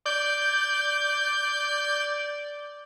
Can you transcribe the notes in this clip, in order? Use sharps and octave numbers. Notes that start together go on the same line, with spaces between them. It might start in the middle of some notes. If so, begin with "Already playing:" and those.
D5 G6